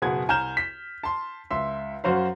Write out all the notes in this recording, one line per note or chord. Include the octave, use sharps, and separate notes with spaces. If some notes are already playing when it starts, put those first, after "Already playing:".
F#1 B2 G#4 F#5 G#6
C2 G#5 A#5 F6 G6 E7
B6
A5 C6
C#2 E5 C6
F#2 F#4 C5 F5